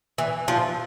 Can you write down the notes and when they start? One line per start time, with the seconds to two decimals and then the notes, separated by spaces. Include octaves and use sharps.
0.18 E3
0.48 F3